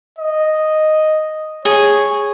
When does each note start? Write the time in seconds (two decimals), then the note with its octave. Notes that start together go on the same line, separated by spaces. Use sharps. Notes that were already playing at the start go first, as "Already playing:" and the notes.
0.19 D#5
1.65 G#4 C#5